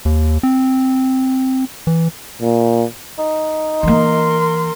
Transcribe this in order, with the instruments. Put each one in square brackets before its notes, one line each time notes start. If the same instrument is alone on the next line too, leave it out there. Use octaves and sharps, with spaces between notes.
[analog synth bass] D#2
C4
E3
[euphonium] A#2
[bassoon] D#4
[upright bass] E3 A#3 [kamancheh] A#4 C6